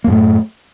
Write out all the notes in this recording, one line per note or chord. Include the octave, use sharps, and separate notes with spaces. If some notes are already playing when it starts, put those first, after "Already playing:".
F#2 A2 A3 A#3